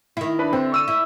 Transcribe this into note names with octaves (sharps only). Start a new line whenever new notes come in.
D#3 E4
D4 B4 B5
D3 C4
C#6 E6 D#7
E4